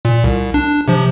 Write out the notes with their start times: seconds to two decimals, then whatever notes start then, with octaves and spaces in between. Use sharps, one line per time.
0.05 A#2
0.24 C2
0.54 D4
0.88 C3 F3